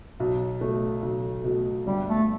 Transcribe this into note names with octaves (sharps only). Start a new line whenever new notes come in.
B1
B2 A3
B1
B2 A3
G1 G3
A3